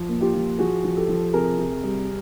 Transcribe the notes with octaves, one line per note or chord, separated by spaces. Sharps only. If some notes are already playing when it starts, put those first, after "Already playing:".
Already playing: F3
A#2
F4 G4
F3
F3 F#4 G#4
F3
G4 A4
F3
C3 G#4 A#4
C3
G3